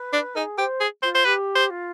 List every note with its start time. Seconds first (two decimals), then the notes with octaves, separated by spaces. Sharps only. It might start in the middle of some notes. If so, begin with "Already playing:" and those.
Already playing: B4
0.13 D4
0.36 D#4 G#4
0.58 G4 C5
0.80 G#4
1.03 F4 C5
1.15 C5
1.25 G4 B4
1.55 C5
1.70 F4